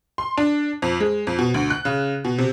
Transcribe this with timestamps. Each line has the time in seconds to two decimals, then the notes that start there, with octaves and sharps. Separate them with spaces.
0.18 C6
0.38 D4
0.82 F2
1.00 G#3
1.27 F2
1.39 B2
1.54 D2
1.70 F#6
1.85 C#3
2.25 B2
2.38 C3